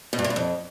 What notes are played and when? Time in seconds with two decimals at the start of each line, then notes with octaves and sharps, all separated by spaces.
0.13 B2
0.19 G2
0.24 C3
0.30 G2
0.36 F2